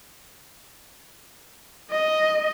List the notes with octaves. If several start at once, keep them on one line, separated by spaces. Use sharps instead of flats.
D#5